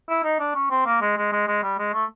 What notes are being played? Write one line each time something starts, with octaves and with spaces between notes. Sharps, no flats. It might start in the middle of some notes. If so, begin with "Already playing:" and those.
E4
D#4
D4
C#4
C4
A#3
G#3
G#3
G#3
G#3
G3
G#3
A3